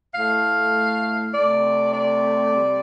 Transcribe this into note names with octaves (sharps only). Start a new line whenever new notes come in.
A2 A3 F5
C3 A3 D5
D5
C3 G3